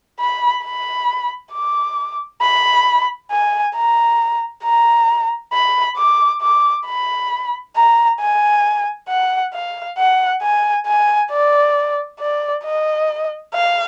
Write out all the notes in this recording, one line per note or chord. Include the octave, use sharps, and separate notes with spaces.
B5
B5
D6
B5
G#5
A#5
A#5
B5
D6
D6
B5
A#5
G#5
F#5
F5
F#5
G#5
G#5
D5
D5
D#5
F5